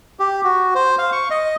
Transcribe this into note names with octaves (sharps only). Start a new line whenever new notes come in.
G4
F#4
C5
F5
C#6
D#5